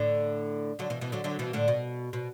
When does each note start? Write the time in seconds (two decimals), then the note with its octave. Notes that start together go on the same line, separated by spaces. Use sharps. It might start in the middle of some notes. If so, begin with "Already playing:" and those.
Already playing: A2 D3
0.79 D3 F#3
0.90 B2 E3
1.01 B2 E3
1.12 D3 F#3
1.24 D3 F#3
1.39 B2 E3
1.53 A2 D3
1.68 B2
2.13 B2